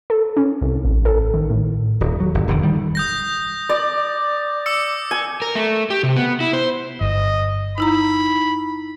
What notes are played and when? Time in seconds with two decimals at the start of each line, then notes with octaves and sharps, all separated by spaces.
0.10 A4
0.37 C#4
0.61 C2
0.85 A1
1.05 A4
1.34 D#3
1.50 A2
2.01 D#1
2.20 F#3
2.35 G1
2.48 D#1 F2 D3 D#3
2.63 D#3 G3
2.95 D#6 G6 A#6
3.69 D5
4.66 D6 E6 C#7
5.11 G#5
5.42 A#4
5.55 A3
5.90 G4
6.03 C3
6.16 B3
6.40 E4
6.53 C5
7.01 G1 D#5
7.78 D#4 E4 A#5 B5